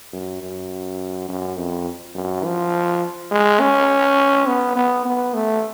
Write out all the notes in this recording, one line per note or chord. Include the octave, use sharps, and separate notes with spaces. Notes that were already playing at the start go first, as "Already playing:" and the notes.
F#2
F#2
F#2
F2
F#2
F3
G#3
C#4
B3
B3
B3
A3